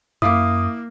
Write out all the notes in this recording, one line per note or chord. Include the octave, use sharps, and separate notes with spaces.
F#2 A#3 E4 F5 D6 D#6